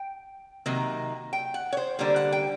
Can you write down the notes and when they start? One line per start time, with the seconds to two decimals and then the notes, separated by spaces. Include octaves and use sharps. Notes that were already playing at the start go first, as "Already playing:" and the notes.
Already playing: G5
0.66 C3 D#3 F#3 A#3 D#4
1.33 G5
1.54 F#5
1.73 C#5
1.77 C5
1.99 D3 G3 A#3 C5
2.16 F#5
2.32 G5